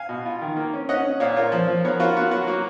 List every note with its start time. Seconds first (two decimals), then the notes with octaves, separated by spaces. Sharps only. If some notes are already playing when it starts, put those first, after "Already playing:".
Already playing: F5 G#5
0.09 B2
0.26 F4
0.41 D#3
0.57 A#3
0.74 C#4
0.89 C#4 D#5 F#5
1.04 C#4
1.20 A#2 C#5 F5
1.36 F4 A#4 C#5
1.52 F3
1.68 F3
1.84 B3 A#4 C#5
2.00 F4 F#4 A#4
2.16 B3 F#4
2.31 F#3 F#4
2.47 A#3 F#4